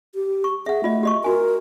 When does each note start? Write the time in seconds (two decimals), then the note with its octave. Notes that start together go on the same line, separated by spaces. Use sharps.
0.15 G4
0.44 C#6
0.66 G#4 E5 F#5
0.84 A3 F4 D#5
1.03 G4 D#5 C#6
1.24 F#4 A#4 G#5